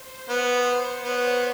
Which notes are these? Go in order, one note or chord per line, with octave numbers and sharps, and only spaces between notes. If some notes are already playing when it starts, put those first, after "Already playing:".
Already playing: C5
B3 B4
C5
B3 C#5